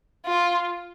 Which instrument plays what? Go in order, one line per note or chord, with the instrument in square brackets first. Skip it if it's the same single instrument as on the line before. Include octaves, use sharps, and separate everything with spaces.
[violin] F4